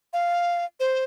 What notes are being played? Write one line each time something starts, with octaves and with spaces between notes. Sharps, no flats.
F5
C5